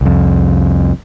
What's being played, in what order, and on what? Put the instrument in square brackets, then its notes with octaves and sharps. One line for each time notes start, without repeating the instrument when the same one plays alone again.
[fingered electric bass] C2 F2